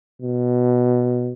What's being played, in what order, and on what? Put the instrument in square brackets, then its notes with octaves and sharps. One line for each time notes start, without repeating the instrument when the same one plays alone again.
[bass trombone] B2